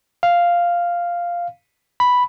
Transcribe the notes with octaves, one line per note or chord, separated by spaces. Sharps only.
F5
B5